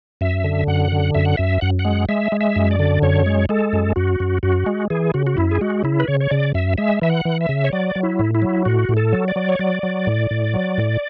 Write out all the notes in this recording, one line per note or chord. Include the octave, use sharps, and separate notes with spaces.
F#2 E5
D3
F#2 F#5
D3
F#2 E5
F#5
F#2 E5
F#2 F#5
F#5
G#3
G#3 E5
G#3
E5
F#2
D5
D3
F#2 C#5
G#3
G#3 A4
F#2
F#2 F#4
F#2
F#2 F#4
G#3
E3 G#4
C#3 F#4
F#4
F#2 E4
G#4
G#3 F#4
C#3 E4
B4
C#3 C#5
C#5
C#3 D5
F#2 E5
G#3 E5
E3 E5
F#5
E3
E5
C#3
C#5
F#3 D5
F#3
E4
A2
E4
F#3
A2 F#4
A2
A4
F#3
D5
F#3
C#5
F#3 D5
F#3
A2
A2
F#3
A2